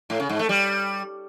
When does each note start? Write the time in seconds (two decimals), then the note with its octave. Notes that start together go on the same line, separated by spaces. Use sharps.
0.10 A2
0.20 C#3
0.29 G#2
0.39 A3
0.49 G3